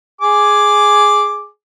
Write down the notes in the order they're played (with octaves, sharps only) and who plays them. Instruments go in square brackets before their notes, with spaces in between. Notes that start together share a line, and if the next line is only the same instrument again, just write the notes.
[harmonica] G#4 G#5 D6